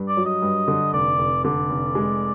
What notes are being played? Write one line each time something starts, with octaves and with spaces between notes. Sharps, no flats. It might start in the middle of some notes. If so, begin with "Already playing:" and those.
Already playing: G2
D5
F#3
D#5
G2
D3
F1 D5
F1
D3 D5
F1
G#3